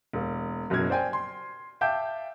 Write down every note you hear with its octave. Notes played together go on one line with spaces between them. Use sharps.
E1 A#3
F#1 F#2 B2 F6 G#6
C5 D5 G5 G#5
C6
E5 F5 G5 A5 D6 G6